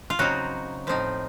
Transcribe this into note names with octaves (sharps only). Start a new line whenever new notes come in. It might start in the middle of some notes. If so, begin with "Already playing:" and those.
F4
C#3 F#3 C4 D#4 F#4
A2 F3 C4 D#4